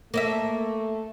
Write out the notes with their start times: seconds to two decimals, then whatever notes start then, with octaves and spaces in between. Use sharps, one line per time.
0.14 A3 A#3 D#5 E5